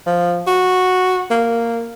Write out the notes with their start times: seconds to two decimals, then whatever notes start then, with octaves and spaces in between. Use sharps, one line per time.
0.07 F3
0.47 F#4
1.31 A#3